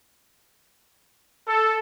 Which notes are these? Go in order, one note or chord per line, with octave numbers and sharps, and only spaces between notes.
A4